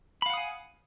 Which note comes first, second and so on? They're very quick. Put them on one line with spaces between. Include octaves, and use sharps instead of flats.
B5 F5 F#5 D#6 G#5